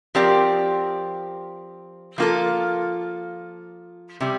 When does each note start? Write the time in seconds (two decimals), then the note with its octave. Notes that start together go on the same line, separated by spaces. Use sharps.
0.15 F3 C4 G4 A#4 D5
2.18 F3 A#3 F4 A4
4.20 C3 G3